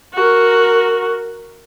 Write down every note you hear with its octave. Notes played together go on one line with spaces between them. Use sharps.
F#4 A#4